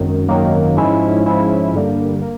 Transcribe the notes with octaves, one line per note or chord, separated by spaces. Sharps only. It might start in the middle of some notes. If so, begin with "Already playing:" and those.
Already playing: G#1 F#2 D#3
G#1 F#2 D#3 F#3 A#3
G#2 F3 G#3 C#4 E4
G#2 F3 G#3 C#4 E4
G2 D3 G3 A#3
A#3